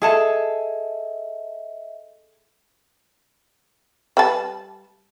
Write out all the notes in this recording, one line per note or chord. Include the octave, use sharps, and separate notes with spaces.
G#4 A4 D#5 E5 A5
G3 B4 A5